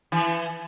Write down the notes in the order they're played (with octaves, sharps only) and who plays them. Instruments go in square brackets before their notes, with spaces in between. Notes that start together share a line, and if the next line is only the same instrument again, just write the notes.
[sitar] E3